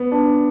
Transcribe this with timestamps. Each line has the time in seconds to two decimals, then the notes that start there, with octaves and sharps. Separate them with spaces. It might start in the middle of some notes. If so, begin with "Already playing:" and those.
Already playing: B3
0.12 D4